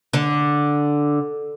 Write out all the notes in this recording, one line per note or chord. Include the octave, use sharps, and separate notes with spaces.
D3